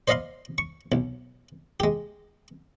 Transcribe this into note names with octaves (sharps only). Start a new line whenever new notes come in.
C5 D5 D#5 F5 B5 C6
C#6
B1
G#3 G4